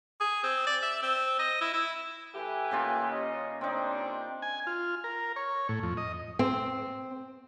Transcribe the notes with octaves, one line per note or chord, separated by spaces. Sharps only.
G#4
C4
D5
E5
C4
D#5
E4
E4
E3 A3 G4 B4 E5 G#5
C#3 A#3 F4
C#4 D#5
C#3 G3 C4 D4 D#4 D5
G#5
F4
A#4
C#5
A2
F2
D#5
C4